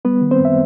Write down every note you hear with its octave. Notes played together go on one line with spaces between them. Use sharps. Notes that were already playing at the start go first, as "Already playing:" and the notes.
G3 B3 B4
D#3
C4 C5
F#2
E5